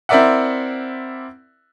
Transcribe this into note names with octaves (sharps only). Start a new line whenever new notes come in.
C4 E4 A#4 D5 E5 F#5